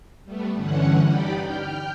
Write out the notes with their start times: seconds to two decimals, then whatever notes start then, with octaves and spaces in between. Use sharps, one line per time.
0.25 G3 A3 B3
0.53 G2 D3 E3 C#4 F#5
1.04 D#4 G4 D5 G5 B5
1.42 G5 F6 G6